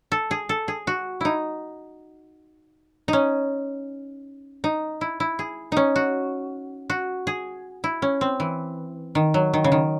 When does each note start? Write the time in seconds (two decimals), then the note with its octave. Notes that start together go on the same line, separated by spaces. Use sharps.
0.12 A4
0.31 G#4
0.49 A4
0.68 G#4
0.87 F#4
1.21 D#4 E4
3.08 D#4
3.13 C#4
4.64 D#4
5.01 E4
5.20 E4
5.39 G#4
5.72 C#4 D#4
5.96 F#4
6.90 F#4
7.27 G#4
7.84 E4
8.02 C#4
8.21 C4
8.40 E3
9.15 D#3
9.34 F#3
9.53 D#3
9.64 C#3
9.72 D#3